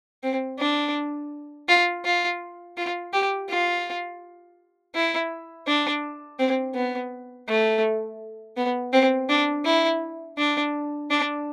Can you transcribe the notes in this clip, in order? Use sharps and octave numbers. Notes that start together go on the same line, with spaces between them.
C4
D4
F4
F4
F4
G4
F4
E4
D4
C4
B3
A3
B3
C4
D4
E4
D4
D4